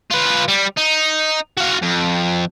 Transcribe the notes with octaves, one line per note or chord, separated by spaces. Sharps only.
F4 B4
G3
D#4
F#4 F5
F2